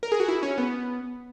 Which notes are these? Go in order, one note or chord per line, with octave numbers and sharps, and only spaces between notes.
A#4
G#4
F#4
E4
C#4
B3